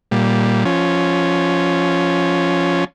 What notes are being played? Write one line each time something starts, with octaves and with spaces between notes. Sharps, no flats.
A#2 G3
F3 C#4